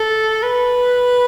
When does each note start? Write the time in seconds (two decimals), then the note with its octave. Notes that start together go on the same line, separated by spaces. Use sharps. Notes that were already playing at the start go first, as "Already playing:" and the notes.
Already playing: A4
0.43 B4